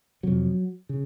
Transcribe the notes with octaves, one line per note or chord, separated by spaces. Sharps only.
F2 C3 F#3
C#3